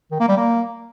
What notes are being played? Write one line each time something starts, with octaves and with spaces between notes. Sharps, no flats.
D#3
A#3
G3
A#3